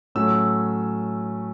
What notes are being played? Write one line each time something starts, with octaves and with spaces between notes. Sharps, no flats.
A2 F#3 A3 C#4 E6